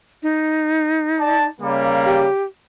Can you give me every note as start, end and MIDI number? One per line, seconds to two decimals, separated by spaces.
0.23 1.47 63
1.18 1.45 74
1.18 1.45 81
1.61 2.26 49
1.61 2.26 55
1.61 2.26 58
2.05 2.44 67